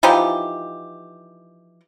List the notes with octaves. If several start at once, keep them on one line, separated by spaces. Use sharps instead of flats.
E3 F3 D#4 G4